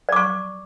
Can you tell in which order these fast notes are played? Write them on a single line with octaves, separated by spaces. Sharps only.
D5 D6 C#6